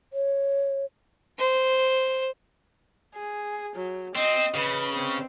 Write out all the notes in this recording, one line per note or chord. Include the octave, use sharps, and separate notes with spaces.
C#5
C5
G#4
F#3
C4 D#5
C#3 B4
C4